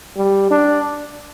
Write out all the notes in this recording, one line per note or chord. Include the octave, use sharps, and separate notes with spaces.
G3
D4